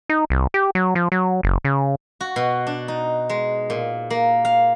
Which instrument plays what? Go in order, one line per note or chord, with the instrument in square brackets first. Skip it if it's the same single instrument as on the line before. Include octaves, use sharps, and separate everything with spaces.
[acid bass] D#4
C2
G4
F#3
F3
F#3
F#1
C#3
[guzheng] F#4
B2
D4
D#4
G#3
A#2
A#3
F5